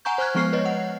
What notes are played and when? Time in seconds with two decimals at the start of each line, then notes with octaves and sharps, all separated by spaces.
0.05 F#5 G#5 A#5 C#6 G6
0.18 C5 C#6 F6 F#6 G#6
0.35 F3 G#3 B3 C#6 F6 C7
0.53 B4 C#5 D#5
0.65 F#5